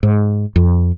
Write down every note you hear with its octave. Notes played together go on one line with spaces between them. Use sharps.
G#2
F2